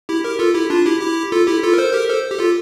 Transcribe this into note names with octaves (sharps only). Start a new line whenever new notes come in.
E4 G4
G4 A#4
F4 A4
E4 G4
D4 F4
E4 G4
E4 G4
F4 A4
E4 G4
F4 A4
A#4
A4 C5
G4 A#4
A4 C5
G4
F4 A4